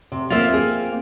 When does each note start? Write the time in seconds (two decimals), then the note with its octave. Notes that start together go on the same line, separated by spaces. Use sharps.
0.12 C3
0.30 A#3 C4 F4 E5
0.50 C4 G#4